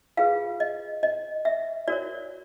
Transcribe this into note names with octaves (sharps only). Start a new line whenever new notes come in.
F4 G#4 B4 F5
D#5
D#5
E5
F#4 A#4 C#5 D5